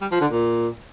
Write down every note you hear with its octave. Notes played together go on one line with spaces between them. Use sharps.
G3
F3
D3
A#2